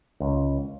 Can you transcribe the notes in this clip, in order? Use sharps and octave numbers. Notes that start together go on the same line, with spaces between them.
C#2